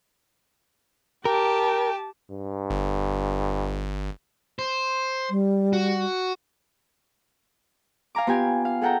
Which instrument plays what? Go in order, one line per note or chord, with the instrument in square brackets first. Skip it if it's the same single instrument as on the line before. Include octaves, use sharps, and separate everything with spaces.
[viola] G4 A5 [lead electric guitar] A#4 [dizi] G5
[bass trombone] G2
[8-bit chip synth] G1
[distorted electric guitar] C5
[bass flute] G3
[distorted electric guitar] F#4
[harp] F5 G#5 A#5 D6
B3 F4 G4 G#5
F5
G#4 A4 F#5 G5 A#5